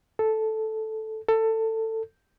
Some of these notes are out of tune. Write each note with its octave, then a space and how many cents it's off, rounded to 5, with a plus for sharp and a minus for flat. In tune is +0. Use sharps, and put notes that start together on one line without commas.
A4 -5
A4 +20